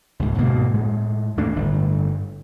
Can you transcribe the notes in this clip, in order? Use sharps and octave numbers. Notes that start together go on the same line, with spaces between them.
C#2 G#2
D2 G#2 B2 A#3
A2 G#3
D#2 A3 A#3 D4
G1 A2